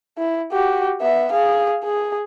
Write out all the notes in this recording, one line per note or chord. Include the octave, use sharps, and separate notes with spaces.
E4
F#4 G4
B3 E5
G#4 F5
G#4